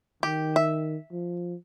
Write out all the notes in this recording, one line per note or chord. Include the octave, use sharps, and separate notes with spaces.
D#3 G4
E5
F3